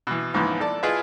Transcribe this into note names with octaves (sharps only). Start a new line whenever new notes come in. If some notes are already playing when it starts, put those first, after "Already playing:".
B2 E3
C#2 G#2 E3 F3 B3 C6
A4 D5 A5
E4 F4 G#4 B4 D#5 E5